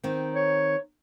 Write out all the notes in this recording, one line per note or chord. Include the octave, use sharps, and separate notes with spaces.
D#3 C4
C#5